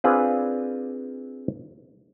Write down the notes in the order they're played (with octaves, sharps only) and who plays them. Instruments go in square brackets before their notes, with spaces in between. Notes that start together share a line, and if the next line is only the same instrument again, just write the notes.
[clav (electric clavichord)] C4 D4 F4 G#4 B4